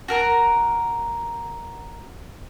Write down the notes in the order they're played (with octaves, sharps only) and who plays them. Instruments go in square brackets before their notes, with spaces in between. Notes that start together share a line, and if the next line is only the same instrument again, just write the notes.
[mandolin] F#4 A#4 A#5